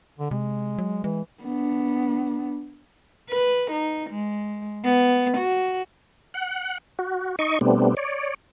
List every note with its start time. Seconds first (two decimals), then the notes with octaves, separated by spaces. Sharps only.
0.19 D3
0.31 C3 G#3
0.78 F#3
1.04 E3 G#3
1.43 B3 D4
3.30 B4
3.71 D#4
4.10 G#3
4.84 B3
5.38 F#4
6.34 F#5
6.99 F#4
7.39 D#4 D#5 C#6
7.61 B2 G3 A3 B3 C4 D4
7.97 C#5 D5